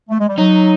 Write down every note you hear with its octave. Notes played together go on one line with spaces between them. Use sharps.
A3
G#3
G3
F#3 D#4